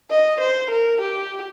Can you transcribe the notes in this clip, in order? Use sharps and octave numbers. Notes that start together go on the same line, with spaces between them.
D#5
C5
A#4
G4